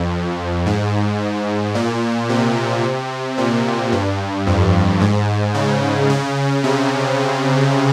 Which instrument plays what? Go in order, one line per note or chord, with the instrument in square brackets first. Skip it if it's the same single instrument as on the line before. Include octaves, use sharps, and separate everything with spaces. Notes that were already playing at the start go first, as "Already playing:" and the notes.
Already playing: [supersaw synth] F2
G#2
A#2
C3
A#2
G2
F2
G#2
C#3
C#3
C3